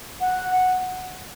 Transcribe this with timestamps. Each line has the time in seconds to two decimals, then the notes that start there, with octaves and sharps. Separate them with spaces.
0.21 F#5